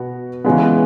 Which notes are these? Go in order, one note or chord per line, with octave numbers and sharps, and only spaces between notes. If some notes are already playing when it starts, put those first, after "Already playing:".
Already playing: B2 B3 F#4
C#3 E3 G#3 B3